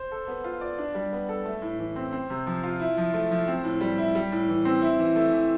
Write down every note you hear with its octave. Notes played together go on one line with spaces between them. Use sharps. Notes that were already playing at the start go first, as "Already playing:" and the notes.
Already playing: C5
A4
B3
F4
D5
D4
G3
B3
A4
A3
A2
E3
C4
C4
C3
F3
F4
E4
F3
A3
F3
C4
A2
G3
E4
G3
A2
E3
C4
E4
E3
A3
E3